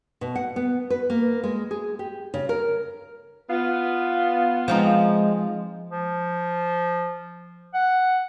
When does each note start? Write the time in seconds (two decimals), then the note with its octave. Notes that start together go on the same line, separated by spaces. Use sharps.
0.21 B2
0.36 F#5
0.56 B3
0.90 B4
1.10 A#3
1.44 G#3
1.71 G#4
1.99 G4
2.34 C#3
2.49 A#4
3.50 B3 F4
4.68 F3 G#3 C4 D#4
5.90 F3
7.74 F#5